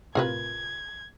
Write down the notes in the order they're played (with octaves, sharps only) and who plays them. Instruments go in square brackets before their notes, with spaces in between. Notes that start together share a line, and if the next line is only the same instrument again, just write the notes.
[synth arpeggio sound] A2 C3 [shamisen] F4 A#4 B4 [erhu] G#6